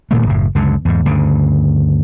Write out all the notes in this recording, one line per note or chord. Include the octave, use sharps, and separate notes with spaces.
D#1 A#2 D#3 A3
F#1 A2
C#2 F#2 D3
E2 G#2
D2 G2 C#3